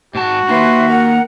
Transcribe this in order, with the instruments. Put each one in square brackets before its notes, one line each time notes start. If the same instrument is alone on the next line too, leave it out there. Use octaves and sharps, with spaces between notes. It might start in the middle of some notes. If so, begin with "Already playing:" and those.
[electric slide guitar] G#2 A5 [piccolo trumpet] F#4
[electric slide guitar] A#3 D#4 [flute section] B4 E5 C6
[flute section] A#4 F#5 A#5